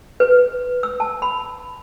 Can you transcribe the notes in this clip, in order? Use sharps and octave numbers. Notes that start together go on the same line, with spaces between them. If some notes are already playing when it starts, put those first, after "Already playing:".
B4
E6
A5
B5